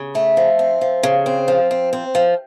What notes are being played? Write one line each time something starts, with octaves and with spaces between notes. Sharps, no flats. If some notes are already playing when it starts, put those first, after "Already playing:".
Already playing: C#3
A3
F3
C4
F3
C#3
C4
F3
C4
C4
F3